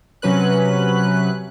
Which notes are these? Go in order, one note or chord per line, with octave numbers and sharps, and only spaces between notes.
C3 F#3 C#4 B4 F#6